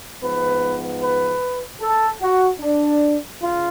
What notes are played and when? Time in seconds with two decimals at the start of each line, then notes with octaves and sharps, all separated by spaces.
0.22 G#2 F3 B3 B4
1.01 B4
1.81 A4
2.21 F#4
2.60 D4
3.40 C#3 F4